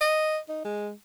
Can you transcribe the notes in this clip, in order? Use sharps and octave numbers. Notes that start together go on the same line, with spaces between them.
D#5
D#4
G#3